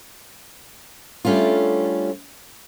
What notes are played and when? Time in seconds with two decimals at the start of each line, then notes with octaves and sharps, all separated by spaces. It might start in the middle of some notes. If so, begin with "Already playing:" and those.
1.25 G3 A3 C#4 D4 F4